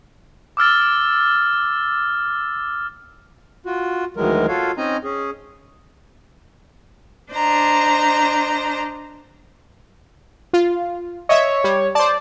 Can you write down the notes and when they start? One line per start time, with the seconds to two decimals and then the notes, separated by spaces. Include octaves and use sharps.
0.57 D6 E6 F6 A6
3.64 F4 F#4
4.17 D2 D#3 E3 F#3 G#3 A#4
4.48 F4 F#4 A4 C#5 F5
4.77 C4 C#4 D#4 D#5 G#5 A#5
5.04 C#4 G#4
7.32 D4 C5 D#5 A#5
10.53 F4
11.29 C#5 D#5 E5
11.64 G3
11.95 C5 D5 A5